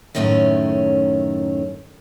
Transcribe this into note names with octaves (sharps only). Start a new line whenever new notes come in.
F#2 A2 D#3 A3 B3 C#4